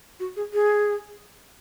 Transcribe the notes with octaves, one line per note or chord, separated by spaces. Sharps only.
F#4
G#4
G#4